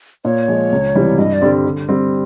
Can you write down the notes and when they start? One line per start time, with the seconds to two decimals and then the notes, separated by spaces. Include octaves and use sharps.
0.25 A#2 C#5
0.48 F3 G#3
0.72 C#2
0.95 C3 E3 G3
1.19 G2 D#5
1.34 D5
1.41 D3 G3 C4
1.65 D3
1.89 G3 C4